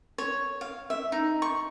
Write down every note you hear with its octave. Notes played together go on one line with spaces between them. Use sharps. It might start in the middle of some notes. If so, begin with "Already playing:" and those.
C#5
F5
E5
D#4
C#6